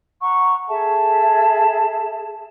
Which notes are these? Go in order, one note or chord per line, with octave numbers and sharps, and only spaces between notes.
F#5 A#5 C#6
G#4 A4 E5 A5